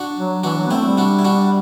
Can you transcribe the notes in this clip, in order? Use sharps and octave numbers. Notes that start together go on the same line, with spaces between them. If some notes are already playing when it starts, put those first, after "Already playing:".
Already playing: D4 F#4
F#3
E3 D4 F#4
F#3
B3
A3 C4 E4
G3
D4 F#4
E4
D4 F#4